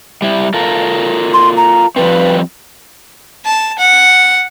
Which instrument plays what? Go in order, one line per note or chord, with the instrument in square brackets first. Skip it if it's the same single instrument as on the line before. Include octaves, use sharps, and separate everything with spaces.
[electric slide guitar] G3 E4
F4 A4 A#4
[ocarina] C6
A#5
[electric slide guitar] F3 G3 C4 [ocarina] B4
[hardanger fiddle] A5
F#5